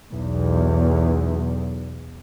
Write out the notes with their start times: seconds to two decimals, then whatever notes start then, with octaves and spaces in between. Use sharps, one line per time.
0.11 B1 E2